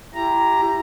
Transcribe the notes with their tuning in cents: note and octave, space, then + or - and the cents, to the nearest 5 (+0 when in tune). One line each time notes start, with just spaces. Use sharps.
E4 +30 G4 +0 A#5 +0